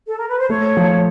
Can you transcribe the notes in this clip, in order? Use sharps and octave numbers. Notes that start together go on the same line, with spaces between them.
A4
A#4
B4
C5
A3 C#5
F3